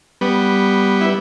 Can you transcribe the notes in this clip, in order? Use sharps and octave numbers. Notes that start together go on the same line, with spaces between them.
G3 B3
E4